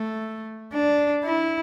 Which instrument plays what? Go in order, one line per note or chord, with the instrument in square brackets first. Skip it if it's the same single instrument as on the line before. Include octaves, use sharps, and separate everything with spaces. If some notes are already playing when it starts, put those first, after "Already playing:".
Already playing: [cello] A3
D4
E4